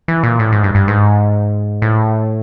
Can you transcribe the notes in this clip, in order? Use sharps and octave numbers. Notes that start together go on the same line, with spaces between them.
E3
A#2
A2
G#2
G2
G2
G#2
A2